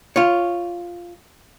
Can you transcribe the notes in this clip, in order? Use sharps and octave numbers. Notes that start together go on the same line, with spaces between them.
F4 C#5